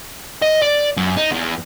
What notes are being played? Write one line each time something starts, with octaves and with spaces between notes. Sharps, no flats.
D#5
D5
F#2
D#4
E2